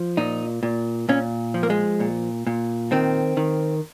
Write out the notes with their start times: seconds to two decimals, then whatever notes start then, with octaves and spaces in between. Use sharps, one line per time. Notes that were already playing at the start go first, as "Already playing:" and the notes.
Already playing: F3
0.17 A#2 D#4
0.63 A#2
1.09 A#2 C#4
1.54 F3
1.63 A#3
1.70 G#3
2.00 A#2
2.47 A#2
2.92 D#3 C4
3.37 D#3